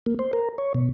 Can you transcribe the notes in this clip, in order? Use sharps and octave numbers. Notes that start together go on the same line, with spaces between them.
A#3
C5
A#4
C#5
B2